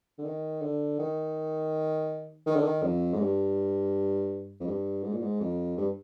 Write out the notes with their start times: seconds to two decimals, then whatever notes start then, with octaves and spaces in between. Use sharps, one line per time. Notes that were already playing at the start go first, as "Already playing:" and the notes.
0.18 D3
0.25 D#3
0.62 D3
0.99 D#3
2.46 D#3
2.56 D3
2.64 D#3
2.83 F2
3.13 G#2
3.20 G2
4.60 F2
4.67 G2
5.03 G#2
5.13 A#2
5.22 G#2
5.40 F2
5.77 G2